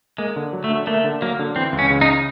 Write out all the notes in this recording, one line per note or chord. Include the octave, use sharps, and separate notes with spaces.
G#3 A#3
D3
F#3
A3
D3
A3 A#3
D3
F#3 A#3
D3
E3 C4
C#2
C#4
C#3
D#4